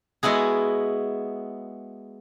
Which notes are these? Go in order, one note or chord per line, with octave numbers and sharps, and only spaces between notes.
G#3 B3 E4 F#4 G#4